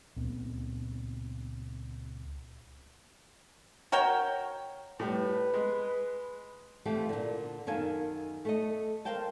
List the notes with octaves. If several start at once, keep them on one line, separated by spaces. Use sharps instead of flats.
C#2 A#2 B3 C4
F#4 A#4 C#5 G5
A2 G3 B4
G#3
E3 F3 A3 C4 F4 G4
A#2 D3
F#2 D#3 A4 F5 G#5
A3 A4 D#5
A#4 C5 F5 G5 A5